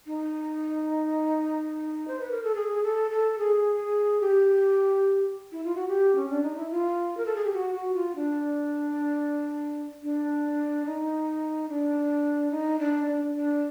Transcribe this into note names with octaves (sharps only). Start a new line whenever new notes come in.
D#4
C5
B4
A#4
A4
G#4
A4
A4
G#4
G4
E4
F4
F#4
G4
C#4
D4
D#4
E4
F4
A#4
A4
G#4
G4
F#4
F#4
F4
D4
D4
D#4
D4
D#4
D4
D4
D4